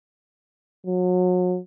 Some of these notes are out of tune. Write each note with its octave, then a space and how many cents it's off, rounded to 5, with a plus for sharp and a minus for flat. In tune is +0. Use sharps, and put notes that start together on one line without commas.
F#3 -35